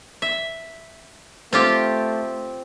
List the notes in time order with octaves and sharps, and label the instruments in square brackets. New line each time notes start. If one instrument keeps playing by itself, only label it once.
[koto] E5
[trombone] A3 [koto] C4 F4 G4